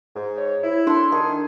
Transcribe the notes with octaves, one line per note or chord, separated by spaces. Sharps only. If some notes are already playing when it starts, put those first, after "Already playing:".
G#2
C#5
E4
D4 A4 C6
D#3 D4 G#4